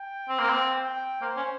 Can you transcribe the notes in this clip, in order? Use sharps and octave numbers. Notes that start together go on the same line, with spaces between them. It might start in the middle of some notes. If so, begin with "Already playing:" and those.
Already playing: G5
C4
A#3
C4
G5
A#3 C5
C#4